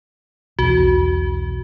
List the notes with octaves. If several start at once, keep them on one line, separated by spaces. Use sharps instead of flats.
B1 E2 F#4